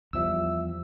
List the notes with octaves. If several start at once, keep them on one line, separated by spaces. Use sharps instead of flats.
E2 F3 G3 E5 E6